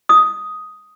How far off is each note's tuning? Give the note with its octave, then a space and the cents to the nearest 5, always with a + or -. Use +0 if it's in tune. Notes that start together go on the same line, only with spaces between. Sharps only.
D#6 +5